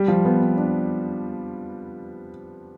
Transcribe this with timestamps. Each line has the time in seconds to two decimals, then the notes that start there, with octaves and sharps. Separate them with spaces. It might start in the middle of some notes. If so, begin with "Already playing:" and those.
Already playing: G3
0.08 F3
0.25 B3
0.40 C4
0.57 D4